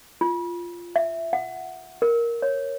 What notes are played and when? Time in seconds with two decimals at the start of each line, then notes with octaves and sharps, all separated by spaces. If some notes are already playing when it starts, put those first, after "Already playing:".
0.21 F4
0.96 E5
1.33 F#5
2.02 A#4
2.42 C#5